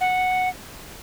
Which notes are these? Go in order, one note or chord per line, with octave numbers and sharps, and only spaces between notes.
F#5